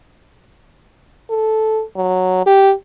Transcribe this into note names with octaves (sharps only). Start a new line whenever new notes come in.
A4
F#3
G4